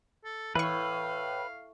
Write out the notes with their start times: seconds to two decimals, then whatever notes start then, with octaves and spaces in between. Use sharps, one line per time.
0.25 A4
0.55 A2 E3 B4 F5 C#6